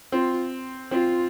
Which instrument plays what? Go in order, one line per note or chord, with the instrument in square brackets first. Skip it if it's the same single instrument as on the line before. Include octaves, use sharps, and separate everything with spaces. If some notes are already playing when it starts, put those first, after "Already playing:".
[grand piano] C4 [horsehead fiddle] F4
[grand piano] C4 [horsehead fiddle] F4